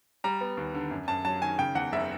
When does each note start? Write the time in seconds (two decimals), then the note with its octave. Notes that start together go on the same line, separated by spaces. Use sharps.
0.24 G3 A#5
0.41 B3
0.57 D#2
0.74 D3
0.91 F#2
1.08 F#2 A5
1.25 F#3 A5
1.42 D#3 G#5
1.58 C#3 G5
1.75 E2 F#5
1.92 F#1 E5